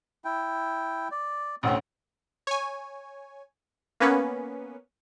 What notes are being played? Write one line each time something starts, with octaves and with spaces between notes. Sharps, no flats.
E4 G5
D5
A1 D2 C4 C#4
C#5 G#5
A#3 B3 C#4 B4